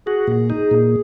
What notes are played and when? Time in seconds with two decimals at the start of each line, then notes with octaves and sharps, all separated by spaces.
0.06 F#4 G#4
0.27 A#2
0.50 D#4
0.71 A#2